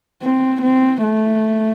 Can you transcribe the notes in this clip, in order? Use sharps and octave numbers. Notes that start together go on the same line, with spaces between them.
C4
C4
A3